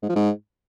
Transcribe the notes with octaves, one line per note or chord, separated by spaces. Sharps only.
G#2
F3
G#2